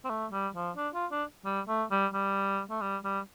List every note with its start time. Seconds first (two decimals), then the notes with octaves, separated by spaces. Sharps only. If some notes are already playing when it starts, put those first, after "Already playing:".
0.04 C4
0.10 A3
0.32 G3
0.55 F3
0.77 D4
0.94 F4
1.12 D4
1.45 G3
1.68 A3
1.91 G3
2.13 G3
2.70 A3
2.81 G3
3.04 G3